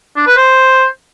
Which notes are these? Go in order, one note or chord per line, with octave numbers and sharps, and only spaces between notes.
D4
B4
C5